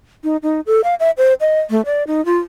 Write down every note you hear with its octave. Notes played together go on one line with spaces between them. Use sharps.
D#4
D#4
A4
F5
E5
C5
D#5
A3
D5
D#4
F4